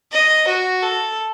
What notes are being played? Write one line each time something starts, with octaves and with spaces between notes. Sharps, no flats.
D#5
F#4
A4